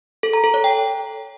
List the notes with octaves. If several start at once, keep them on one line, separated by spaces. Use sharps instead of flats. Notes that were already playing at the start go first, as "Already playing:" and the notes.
A4
A#5
A4
C#5
G5